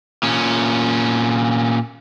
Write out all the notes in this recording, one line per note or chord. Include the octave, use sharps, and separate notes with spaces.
A#2 C#4